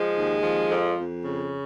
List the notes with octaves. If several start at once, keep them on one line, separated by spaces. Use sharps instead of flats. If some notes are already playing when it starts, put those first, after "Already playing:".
Already playing: F3 G#3
D#2
F3
F2
F2
C#3